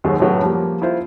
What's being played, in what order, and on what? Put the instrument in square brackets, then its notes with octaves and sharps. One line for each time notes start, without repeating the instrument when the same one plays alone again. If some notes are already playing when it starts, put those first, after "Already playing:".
[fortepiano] D#2 G#2 D#3 F#3
F#2 A2 C#3 F#3 B3
F3 G3 A#3
E4 F4 C5